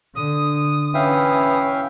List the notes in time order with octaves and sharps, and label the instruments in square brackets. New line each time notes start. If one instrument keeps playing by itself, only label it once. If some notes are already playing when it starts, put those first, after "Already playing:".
[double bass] D3 [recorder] D#6
[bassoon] E3 [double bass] C#4 [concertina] E5 F5 G5